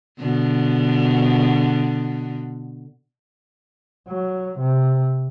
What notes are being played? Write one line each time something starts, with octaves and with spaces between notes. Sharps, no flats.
B2 D3
F#3
C3